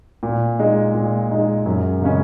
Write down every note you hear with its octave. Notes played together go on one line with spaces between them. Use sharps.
A#2
G#3 D#4
A#2
G#3 D#4
F#2
C#3 G#3 C#4